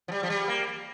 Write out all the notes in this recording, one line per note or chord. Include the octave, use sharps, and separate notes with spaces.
F3
G3
F3
G3
A#3